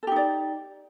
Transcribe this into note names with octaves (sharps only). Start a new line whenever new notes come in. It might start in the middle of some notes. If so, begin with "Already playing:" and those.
D#4 G4 A4 D5